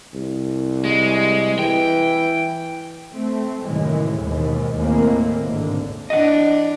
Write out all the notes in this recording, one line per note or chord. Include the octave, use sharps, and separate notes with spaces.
C2
G#3
E3 G5
A3 C4
F#2 A2 C3 D#3 E3 G#3
D#2 G#2 B2
D#2 A2 G#3 A#3 C4
G#1 D3
E3 D4 D#5 F#5